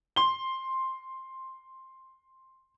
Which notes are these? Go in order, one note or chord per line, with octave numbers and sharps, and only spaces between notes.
C6 G7